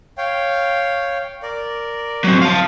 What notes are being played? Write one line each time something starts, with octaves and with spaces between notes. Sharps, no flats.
C#5 F5 G5
A#4 D5
F#3 C4
F5 A5